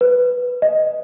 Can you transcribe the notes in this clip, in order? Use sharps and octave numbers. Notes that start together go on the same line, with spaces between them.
B4
D#5